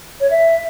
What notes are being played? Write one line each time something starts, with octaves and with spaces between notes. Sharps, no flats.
C#5
E5